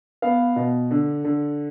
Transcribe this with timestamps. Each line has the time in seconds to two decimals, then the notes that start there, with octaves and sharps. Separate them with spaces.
0.22 B3 F5
0.56 B2
0.91 D3
1.24 D3